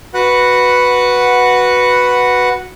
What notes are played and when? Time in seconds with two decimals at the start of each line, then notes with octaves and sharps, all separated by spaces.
0.14 F#4 B4 F#5